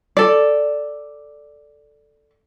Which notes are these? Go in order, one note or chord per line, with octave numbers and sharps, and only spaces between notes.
A4 D5